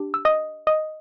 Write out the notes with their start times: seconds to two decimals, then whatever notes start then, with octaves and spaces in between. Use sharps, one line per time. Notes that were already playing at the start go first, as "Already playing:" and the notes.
Already playing: D4 G4
0.14 E6
0.25 D#5 D#6
0.67 D#5 D#6